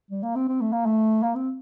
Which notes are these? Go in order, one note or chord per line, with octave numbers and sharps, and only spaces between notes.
G3
A#3
C4
C4
A3
A#3
A3
A#3
C4